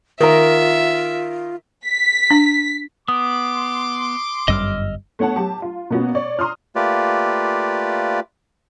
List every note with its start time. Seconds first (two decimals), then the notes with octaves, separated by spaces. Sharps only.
0.20 D#3 F4 A#4 E5
1.87 B6
2.31 D4
3.08 B3 C6 D6 D#6
4.48 G1 F#2 G3 D#5 E6 F6
5.19 A3 B3 C#5 F#5 A5
5.36 F#3 G4 A5
5.62 F4
5.90 B2 A#3 B3 C#4 F#4
6.15 C#5 D5 C#6
6.39 A#5 C6 D#6 F6
6.75 A3 A#3 F4 G4 B4 D5